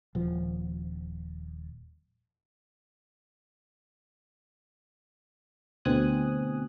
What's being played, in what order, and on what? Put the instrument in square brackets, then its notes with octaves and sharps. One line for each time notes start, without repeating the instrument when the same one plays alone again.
[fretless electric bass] D#1 F3
[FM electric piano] D2 B2 C4 G#5 D#6 F#6